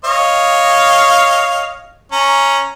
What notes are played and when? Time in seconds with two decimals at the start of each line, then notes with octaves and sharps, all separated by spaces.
0.05 C#5 D#5 F5
2.12 C#4 A#5